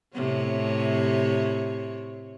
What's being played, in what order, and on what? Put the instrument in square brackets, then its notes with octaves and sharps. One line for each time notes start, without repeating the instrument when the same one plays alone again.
[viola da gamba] A2 C3 C#5